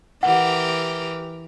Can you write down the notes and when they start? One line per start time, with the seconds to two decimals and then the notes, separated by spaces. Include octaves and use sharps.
0.23 E3 G4 A#4 F#5